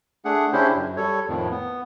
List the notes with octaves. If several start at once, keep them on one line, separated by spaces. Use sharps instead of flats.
A3 D4 G#4 F#5
C#3 C#4 D4 E4 G4 C5
F#2
G3 A4 C#5
F2 A2 D#3 F3
B3